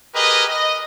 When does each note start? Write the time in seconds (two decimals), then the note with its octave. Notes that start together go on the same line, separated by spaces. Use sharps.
0.14 G4 G#4 A#4 B4 D#5
0.48 D#5